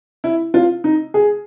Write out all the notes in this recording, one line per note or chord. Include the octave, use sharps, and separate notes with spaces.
E4
F4
D#4
G#4